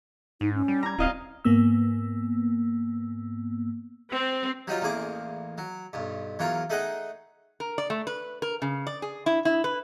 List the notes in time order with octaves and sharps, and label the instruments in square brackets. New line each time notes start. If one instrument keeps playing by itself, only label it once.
[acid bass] G#2 [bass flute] D#4
[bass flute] C#4
[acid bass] G3
[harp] A#5 G#6
[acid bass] D1 [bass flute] C4 [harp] F4 D#5 F5
[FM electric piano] G#2 A#3 B3 E6
[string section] C4
[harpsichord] F#3 G3 D#4 F4
A1 E2 A#3 G#4 D6
F#3
B1 G2
E2 F#3 F4 A#4
A3 D#4 G#4 D#5 F#5
[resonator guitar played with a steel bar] A#4
D5
A3
B4
A#4
C#3
D5
G#4
E4
E4
B4